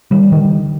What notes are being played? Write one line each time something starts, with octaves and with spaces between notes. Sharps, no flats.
D#3 G3
D3 D#3 G3